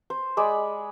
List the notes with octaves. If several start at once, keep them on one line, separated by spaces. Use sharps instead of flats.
C5
G#3 D5 B5